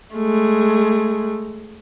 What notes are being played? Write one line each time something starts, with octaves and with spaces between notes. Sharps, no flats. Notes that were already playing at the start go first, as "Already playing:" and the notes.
G#3 A3